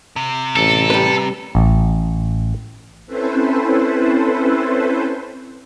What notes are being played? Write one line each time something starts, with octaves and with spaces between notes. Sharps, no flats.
C3
A1 A4
G3 B4
A1
C4 C#4 E4 A4 B4 C5